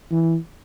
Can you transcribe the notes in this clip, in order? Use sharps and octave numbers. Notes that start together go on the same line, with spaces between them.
E3